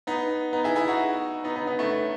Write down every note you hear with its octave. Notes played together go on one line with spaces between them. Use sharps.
B3 D#4
B3 D#4
E4 G#4
E4 G#4
D#4 F#4
B3 D#4
B3 D#4
B3 D#4
A3 C#4